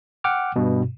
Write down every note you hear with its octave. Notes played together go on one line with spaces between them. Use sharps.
F#5 G5 D6 F6
G2 B2